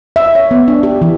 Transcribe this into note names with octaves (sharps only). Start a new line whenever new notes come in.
E5
C#5
B3
D4
G4
E3